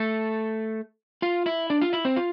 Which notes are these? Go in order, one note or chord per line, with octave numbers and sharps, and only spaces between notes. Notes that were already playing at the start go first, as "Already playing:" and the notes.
Already playing: A3 A4
F4 F5
E4 E5
D4 D5
F4 F5
E4 E5
C4 C5
F4 F5